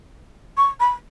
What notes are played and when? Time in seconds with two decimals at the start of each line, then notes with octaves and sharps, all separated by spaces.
0.57 C#6
0.80 B5